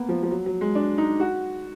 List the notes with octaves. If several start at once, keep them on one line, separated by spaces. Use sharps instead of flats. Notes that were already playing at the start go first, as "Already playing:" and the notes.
Already playing: A#3 B3
F3
F3
F#3
F#3
G#3
D4
D#4
F#4